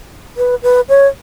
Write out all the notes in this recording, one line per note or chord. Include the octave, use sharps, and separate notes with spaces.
B4
B4
C#5